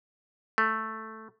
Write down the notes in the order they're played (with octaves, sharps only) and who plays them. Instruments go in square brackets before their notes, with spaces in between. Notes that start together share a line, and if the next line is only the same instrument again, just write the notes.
[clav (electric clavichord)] A3